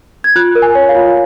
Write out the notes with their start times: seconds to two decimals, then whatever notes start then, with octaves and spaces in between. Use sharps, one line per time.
0.24 G#6
0.36 F4 F#6
0.55 A#4
0.62 G#5
0.75 C#5
0.89 F5
0.95 F4